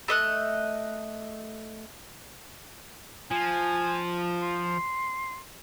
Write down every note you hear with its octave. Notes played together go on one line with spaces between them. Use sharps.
A3 D#5 F#6
F3 G#5
C6